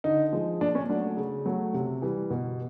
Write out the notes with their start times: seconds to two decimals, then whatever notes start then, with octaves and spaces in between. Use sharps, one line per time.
0.04 D3 D#4
0.33 F3 G#3
0.61 A#2 D4
0.75 C#4
0.89 F#3 A3 D4
1.17 C#3
1.45 F#3 A3
1.74 C3
2.02 E3 G3
2.30 B2